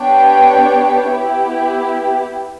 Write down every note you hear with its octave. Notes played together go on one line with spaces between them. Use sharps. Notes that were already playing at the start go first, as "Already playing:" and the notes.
Already playing: B3 D4 G4 C#5 G5
B3 E4 G4